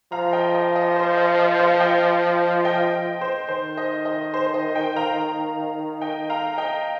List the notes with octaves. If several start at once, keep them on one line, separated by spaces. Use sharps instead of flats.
F3 F5 A#5
D#5 G5
D#5
D#5
C5
D#5
D#5
C5 F5
D#5 G5
D#5 G5
D#5
C5
D#3 C5
D#5
D#5
C5
C5
D#5
D#5 G5
F5 A#5
D#5 G5
F5 A#5
D#5 G5